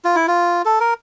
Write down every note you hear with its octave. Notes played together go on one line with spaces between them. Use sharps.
F4
E4
F4
A4
A#4